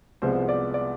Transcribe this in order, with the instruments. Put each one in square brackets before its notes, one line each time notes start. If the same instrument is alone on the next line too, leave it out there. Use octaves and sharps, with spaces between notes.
[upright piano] C2 C3 F3 G#3 B3 C5
D5
D5